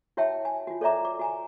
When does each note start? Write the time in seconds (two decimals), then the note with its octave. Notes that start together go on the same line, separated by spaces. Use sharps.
0.17 E4 F#4 C#5 E5 G5 A5
0.45 G#5
0.67 F4 F#4
0.81 A4 C#5 D5 E5 A#5 D6
1.05 D6
1.19 F#4 G#5 A#5